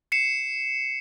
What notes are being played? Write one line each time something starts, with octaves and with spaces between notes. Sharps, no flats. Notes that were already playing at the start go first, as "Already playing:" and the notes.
C7 C#7 E7